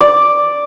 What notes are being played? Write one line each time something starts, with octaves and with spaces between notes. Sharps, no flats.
D5